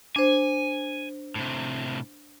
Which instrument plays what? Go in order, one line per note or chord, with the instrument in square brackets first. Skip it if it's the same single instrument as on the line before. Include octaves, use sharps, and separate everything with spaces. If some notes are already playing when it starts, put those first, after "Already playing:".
[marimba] D4 C5 [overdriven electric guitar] G#5
[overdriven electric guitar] A2 C3